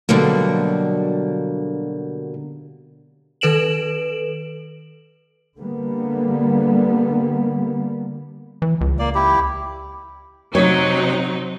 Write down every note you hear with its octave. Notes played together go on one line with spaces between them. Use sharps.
B2 D3 F#3 G3 A#3
D#3 A4 B4 D7 E7 F#7
D3 G3 A#3 B3
E3
C#2
A#3 D5
E4 G4
C3 F#3 D#4 C#5